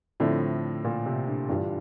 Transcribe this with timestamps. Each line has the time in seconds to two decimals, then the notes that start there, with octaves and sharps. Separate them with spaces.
0.20 A2 D3 F3 C4 E4
0.85 A#2
1.06 C3
1.27 D3
1.48 G2 D3 E3 G3 D4 F4